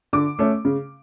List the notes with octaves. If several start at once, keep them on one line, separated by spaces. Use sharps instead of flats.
D3 D6
A3 C#4
C#3